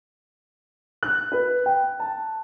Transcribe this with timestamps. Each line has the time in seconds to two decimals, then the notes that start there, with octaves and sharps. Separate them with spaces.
1.03 F#6
1.32 B4
1.66 G5
2.00 A5